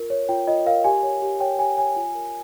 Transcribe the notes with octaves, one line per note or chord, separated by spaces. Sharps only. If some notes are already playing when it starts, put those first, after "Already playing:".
Already playing: F4 A#4
C#5
F4 G5
F4 D#5
A#4 F5
G4 G#5
C#5
G4
C#5 G5
G4 G#5
C#5 G#5
F4
A#4